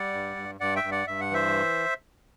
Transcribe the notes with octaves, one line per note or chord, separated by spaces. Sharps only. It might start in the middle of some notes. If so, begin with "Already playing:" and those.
Already playing: G3 D5 F#5
G2
G2
G2 D5 F#5
E5 G5
G2
D5 F#5
G2 E5
F#5
E3 C5 E5